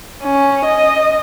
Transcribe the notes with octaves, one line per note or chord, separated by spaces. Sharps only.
C#4
D#5